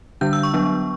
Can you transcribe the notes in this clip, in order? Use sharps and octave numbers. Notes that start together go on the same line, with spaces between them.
D3 G3 D4 G6
E6
C#6
F#3 B3 D4